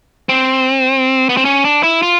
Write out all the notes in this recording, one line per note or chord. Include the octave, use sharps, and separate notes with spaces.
C4
B3
C4
C#4
D4
E4
F4